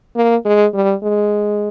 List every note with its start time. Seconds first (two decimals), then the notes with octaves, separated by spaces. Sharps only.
0.16 A#3
0.45 G#3
0.74 G3
1.03 G#3